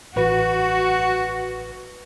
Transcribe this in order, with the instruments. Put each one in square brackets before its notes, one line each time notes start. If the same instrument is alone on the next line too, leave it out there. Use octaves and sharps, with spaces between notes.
[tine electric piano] A1 B4 [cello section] F#4